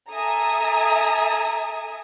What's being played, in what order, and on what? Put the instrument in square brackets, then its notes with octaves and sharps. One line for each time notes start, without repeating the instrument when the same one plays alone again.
[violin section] A4 E5 G#5 A#5 D#6